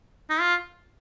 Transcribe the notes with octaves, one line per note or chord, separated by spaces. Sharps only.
D#4
F4